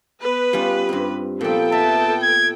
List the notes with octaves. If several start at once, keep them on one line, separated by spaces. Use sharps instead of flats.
B3 B4
G3 C#4 F4
G2 C4
A#2 F3 B3 A4 G5
E5 A5
G#6